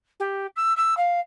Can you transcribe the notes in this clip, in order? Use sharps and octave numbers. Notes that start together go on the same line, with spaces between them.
G4
E6
E6
F5